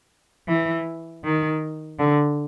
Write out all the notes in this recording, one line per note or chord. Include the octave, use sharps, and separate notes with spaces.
E3
D#3
D3